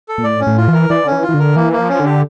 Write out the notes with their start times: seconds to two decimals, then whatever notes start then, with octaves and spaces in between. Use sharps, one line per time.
0.08 A4
0.18 A#2
0.24 A2 D5
0.40 C#4
0.47 A2
0.57 F4
0.68 E3
0.73 A#4
0.90 E3 D5
1.04 D3 C#4
1.12 E3
1.23 F4
1.29 E3
1.34 D3 A#4
1.56 E3 A#3
1.72 A#3
1.78 F3
1.89 C#4
2.00 D3
2.05 G4